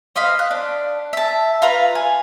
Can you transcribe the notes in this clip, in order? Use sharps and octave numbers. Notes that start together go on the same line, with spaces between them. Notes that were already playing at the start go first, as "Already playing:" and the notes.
C5 D#5 F5 B5
F#6
D4
E5 A5
F4 B4 A#5
G#5